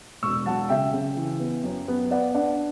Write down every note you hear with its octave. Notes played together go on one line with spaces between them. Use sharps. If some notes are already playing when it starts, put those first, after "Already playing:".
E1 C#6 E6
F#3 F#5 A5
C#3 E5 G5
C#3
E3
B3
F#2
B3
B3 D5 F#5
D4 D5 F#5